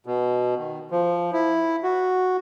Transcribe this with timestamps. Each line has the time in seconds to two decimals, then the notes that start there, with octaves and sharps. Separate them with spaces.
0.06 B2
0.58 D#3
0.91 F3
1.33 E4
1.83 F#4